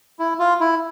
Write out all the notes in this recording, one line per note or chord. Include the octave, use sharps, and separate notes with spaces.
E4
F4
E4